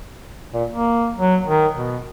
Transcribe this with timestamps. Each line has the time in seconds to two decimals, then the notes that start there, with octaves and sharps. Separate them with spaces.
0.53 A#2
0.69 A#3
1.17 F#3
1.46 D#3
1.75 B2